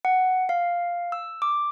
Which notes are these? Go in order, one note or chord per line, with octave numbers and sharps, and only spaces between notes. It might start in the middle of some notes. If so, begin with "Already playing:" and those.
F#5
F5
E6
D6